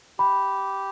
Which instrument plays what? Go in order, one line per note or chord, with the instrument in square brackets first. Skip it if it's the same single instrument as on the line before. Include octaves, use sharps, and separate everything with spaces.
[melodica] G4 [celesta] B5